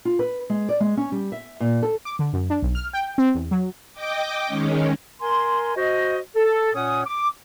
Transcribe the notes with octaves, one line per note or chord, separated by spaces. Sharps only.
F4
B4
G#3
D5
G#3
C#4
G3
E5
A#2
A4
D6
D3
F#2
D4
B1
F6
G5
C4
E2
F#3
D#5 G5 D6
D#3 G#3 C#4
A#4 G#5 C6
F#4 C5 D#5
A4
A#2 C#4 C#5 F#5 G#5 D#6
D6